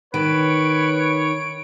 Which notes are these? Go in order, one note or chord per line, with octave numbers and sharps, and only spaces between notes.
D#3 B4 C#5 D7